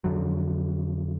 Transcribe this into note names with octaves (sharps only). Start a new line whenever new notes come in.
F2 D3 F#3